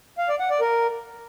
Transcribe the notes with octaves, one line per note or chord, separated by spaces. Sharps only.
F5
D5
F#5
D5
A#4